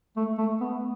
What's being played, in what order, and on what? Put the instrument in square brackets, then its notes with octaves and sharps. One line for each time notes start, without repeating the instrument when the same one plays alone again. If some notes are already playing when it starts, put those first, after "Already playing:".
[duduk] A3
A3
B3